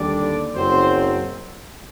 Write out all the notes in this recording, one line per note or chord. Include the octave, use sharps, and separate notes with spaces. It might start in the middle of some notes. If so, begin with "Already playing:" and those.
Already playing: D#2 D3 G3 D4 D5
F#1 F#2 F#3 C4 C5